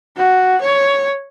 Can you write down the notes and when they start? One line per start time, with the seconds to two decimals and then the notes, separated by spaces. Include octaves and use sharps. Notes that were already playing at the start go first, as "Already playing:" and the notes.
0.17 F#4
0.61 C#5